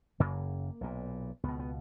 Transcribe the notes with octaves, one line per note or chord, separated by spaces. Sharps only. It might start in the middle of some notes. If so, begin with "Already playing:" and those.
F#1 F#2 C#3 A#3
B1 A#2
C#2 B2 B3
B3